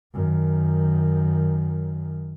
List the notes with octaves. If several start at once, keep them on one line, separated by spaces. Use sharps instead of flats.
F#2 D#3